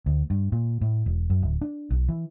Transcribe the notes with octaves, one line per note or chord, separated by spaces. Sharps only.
D2
G2
A#2
A2
E1
F#2
D1
D4
B1
E3